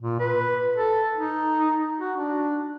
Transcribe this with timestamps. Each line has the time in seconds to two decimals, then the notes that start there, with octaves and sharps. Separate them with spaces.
0.01 A#2
0.20 B4
0.76 A4
1.18 D#4
1.99 F#4
2.16 D4